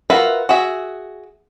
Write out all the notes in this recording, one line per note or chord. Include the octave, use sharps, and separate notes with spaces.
F4 F#4 A#4 B4 E5
F#4 G#4 E5